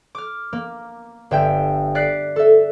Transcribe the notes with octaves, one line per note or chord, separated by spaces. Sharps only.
D6 F6
A#3
G1 E5 G5 G6
D5 F#6 B6 C7 D7
A4 E5